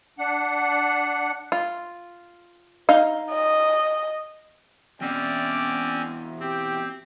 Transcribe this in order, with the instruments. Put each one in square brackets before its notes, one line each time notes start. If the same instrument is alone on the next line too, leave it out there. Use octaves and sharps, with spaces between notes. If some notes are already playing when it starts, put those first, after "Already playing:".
[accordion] D4 F#5
[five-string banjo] F4
D#4 F5
[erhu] D#5
[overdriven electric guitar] E2 B2 [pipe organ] C4 C#4 [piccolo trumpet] D5
[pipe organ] C4 [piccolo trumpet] G4